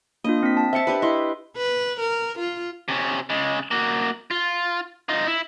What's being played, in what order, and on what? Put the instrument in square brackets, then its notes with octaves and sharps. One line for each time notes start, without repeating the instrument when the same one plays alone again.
[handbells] A#3 D4 F4 [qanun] D#5
[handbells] C4 B6
A5
[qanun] C4 A5 [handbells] E5 C#7
[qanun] D4 G4 B4
[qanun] E4 [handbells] D#5 C6
[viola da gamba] B4
A#4
F4
[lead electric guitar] C3 C#4
C#3 G#3
A#3 F#4
F4
D#4 F4
E4